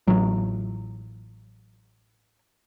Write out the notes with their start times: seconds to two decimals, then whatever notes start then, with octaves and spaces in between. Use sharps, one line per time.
0.07 A1 F#3